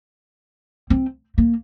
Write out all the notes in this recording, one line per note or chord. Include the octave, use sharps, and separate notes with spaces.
C4
A#3